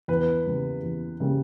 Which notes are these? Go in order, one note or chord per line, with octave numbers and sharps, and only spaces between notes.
E2 B4
C#3 G3 A#3
E2
C#3 G3 A#3